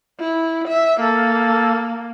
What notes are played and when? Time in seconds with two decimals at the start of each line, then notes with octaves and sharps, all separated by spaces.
0.20 E4
0.68 E5
1.00 A#3 A4